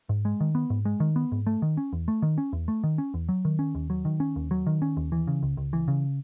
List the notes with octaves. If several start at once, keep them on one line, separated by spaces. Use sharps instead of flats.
G#2
G#3
D#3
B3
G#2
G#3
D#3
B3
G#2
A3
D#3
C#4
E2
A3
D#3
C#4
E2
A3
D#3
C#4
E2
F#3
D#3
C#4
D#2
F#3
D#3
C#4
D#2
F#3
D#3
C#4
D#2
E3
C#3
C#2
C#2
E3
C#3